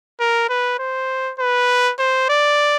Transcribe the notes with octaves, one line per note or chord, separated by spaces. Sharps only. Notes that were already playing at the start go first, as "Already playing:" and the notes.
A#4
B4
C5
B4
C5
D5